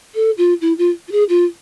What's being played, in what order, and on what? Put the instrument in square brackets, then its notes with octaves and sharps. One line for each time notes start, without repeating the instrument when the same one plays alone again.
[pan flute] A4
F4
E4
F4
F4
G#4
F4